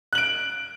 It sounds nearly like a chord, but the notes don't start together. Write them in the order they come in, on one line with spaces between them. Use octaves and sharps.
F#6 F#7 D7